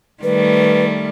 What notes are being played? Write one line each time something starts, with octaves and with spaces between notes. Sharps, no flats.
D#3 G3 A3 B4